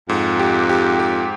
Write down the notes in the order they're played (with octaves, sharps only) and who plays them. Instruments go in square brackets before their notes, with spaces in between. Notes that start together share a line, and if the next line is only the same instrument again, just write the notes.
[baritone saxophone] F2 [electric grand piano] G#2
[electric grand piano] G4
G4
G4